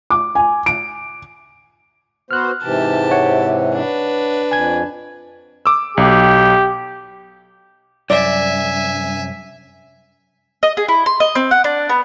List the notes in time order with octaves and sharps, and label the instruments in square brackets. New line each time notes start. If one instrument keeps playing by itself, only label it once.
[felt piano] D6
G#5
D7
[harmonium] B3 F#4 C5 [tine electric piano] F6 F#6
[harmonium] G#2 C3 E3 [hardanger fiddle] G4 A5
[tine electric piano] C#5 F#5
[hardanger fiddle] D4 B4
[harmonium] F2 [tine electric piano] G#5 G#6
[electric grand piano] D6 E6
[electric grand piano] B1 [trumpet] G4
[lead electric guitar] C2 F#2 [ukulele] D5 [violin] E5 G#5
[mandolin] D#5
G#4
E4
C6
D#5
C4
F#5
D4
B3